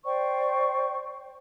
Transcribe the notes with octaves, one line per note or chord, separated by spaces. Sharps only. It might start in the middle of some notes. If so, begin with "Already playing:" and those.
C5 D5 G5 C#6